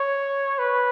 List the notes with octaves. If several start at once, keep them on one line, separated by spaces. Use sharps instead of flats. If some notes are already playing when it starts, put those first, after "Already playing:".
Already playing: C#5
B4